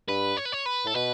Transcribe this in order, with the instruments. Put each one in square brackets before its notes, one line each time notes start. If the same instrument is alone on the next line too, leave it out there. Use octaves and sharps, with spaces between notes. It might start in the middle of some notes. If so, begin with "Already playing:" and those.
[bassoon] G2 [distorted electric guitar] B4
[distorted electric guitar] C#5
B4
C#5
B4
[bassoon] A2 [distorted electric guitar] A4
[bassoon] B2 [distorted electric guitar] B4